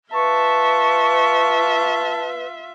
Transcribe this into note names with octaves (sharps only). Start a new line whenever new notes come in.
F4 B4 E5 A5 C#6